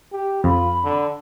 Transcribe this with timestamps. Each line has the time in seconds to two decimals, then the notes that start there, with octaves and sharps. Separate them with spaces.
0.12 G4
0.44 F2 F4 B5
0.84 D3